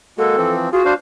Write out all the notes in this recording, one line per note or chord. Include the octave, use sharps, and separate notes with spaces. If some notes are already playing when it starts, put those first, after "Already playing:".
G#3 A#3 F#4 A4
E3 F3 C4
F4 F#4 G#4
D4 C5 F5